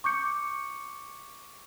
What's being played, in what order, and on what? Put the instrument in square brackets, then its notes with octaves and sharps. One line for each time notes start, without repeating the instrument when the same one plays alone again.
[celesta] C#6 D6 G6 C#7